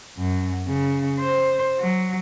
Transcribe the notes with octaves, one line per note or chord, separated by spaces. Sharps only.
F#2
C#3
C5
F#3